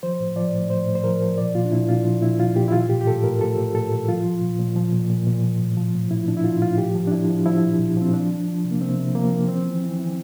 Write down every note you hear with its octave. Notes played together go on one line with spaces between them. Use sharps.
F3 C5
A2
F3 D5
A2
A2 C5
A2
C5
F3 A#4
F3
A#2 D5
A#2 F4
D4
A#2 E4
A#2 F4
F3
A#2 E4
F3 F4
A#2 G4
E4
E3 F4
A2 G4
G4
A2 A4
A2 A#4
A2 A4
A2
A2 A4
A2
F3 F4
F3
A#2
A#2
F3
A#2
A#2
A#2
F3
A2
F3
A2
A2 E4
F3 D4
E4
F3 F4
A2 F4
F3 G4
F3
D4
F3 E4
F3
F3 E4
A#2
A#2
F3 C4
F3 D4
F3
F3
C3
A#3
C3 C4
C3
F3 A#3
F3
E3 C4
E3
E3
E3